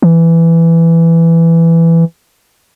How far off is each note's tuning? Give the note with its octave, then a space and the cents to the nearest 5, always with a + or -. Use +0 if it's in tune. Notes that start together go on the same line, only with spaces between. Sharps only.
E3 +10